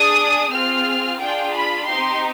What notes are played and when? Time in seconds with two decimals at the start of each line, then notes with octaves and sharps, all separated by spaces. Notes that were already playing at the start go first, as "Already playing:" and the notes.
Already playing: D4 G#4 D#6
0.52 C4 F4 G#4 F6
1.20 D4 F4 G#4 G5
1.54 B5
1.87 C4 D#4 G4 C6